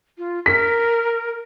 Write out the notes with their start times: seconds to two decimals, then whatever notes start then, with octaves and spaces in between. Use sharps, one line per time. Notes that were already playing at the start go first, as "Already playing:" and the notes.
0.17 F4
0.46 A#4 B6